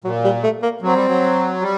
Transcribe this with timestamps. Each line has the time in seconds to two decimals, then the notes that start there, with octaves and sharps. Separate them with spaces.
0.04 A#2 F#3
0.24 G3
0.43 A3
0.62 A#3
0.82 F#3 C4
0.94 G3
1.07 F#3
1.61 G3